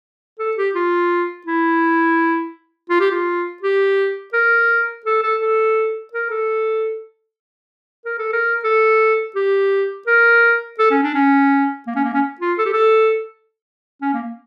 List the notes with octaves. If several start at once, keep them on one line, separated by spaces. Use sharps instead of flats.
A4
G4
F4
E4
F4
G4
F4
G4
A#4
A4
A4
A4
A#4
A4
A#4
A4
A#4
A4
G4
A#4
A4
C#4
D4
C#4
A#3
C#4
A#3
C#4
F4
A4
G4
A4
C#4
A#3